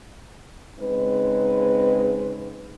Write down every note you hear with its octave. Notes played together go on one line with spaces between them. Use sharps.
C#3 G#3 C4 D#4 B4